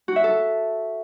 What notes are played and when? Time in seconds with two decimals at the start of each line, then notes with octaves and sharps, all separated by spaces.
0.08 F#4
0.16 E5
0.24 A4